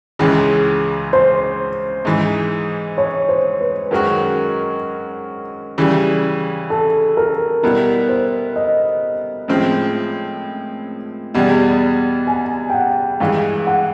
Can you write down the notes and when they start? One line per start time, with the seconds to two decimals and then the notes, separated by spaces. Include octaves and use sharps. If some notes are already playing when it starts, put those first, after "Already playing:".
0.19 C#2 C#3 E3 G#3
1.13 C5
2.05 G#2 E3 G#3
2.98 C#5
3.29 C5
3.61 B4
3.91 F#2 D#3 G#3 C#4 F#4 A#4
5.78 C#3 E3 G3
6.70 A4
7.17 A#4
7.63 B2 G3 B3 E4 A#4
8.09 C5
8.56 D#5
9.48 A2 F3 G#3 C4
11.34 E2 B2 G3
12.27 G#5
12.70 G5
12.74 F#5
13.20 G2 E3 G#3 F5
13.67 F#5